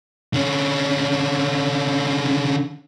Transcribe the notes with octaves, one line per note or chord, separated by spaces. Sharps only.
D3 C#4